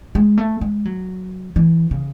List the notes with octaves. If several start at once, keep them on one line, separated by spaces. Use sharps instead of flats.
G#3
A3
G#3
F#3
E3
C#3